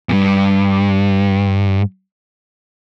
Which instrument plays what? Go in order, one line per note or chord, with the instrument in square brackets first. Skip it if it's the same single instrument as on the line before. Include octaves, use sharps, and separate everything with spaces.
[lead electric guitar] E2 G2